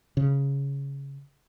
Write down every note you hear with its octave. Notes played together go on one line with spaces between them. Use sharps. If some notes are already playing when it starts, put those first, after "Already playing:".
C#3